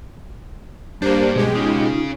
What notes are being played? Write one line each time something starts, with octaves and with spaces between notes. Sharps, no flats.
G2 A#3 D4 G4 C5
B2 G#3 G4 G#4
C#3 D#4 F4